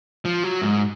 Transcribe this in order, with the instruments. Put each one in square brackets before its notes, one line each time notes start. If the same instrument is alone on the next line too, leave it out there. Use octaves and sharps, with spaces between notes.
[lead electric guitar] F3
F#3
G#2